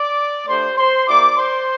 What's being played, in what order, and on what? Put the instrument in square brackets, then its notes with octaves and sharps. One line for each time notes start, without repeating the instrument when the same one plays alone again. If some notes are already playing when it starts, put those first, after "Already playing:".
Already playing: [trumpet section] D5 D6
A3 D4 G4 C5 C6
C5 C6
A#3 E4 G4 D5 D6
C5 C6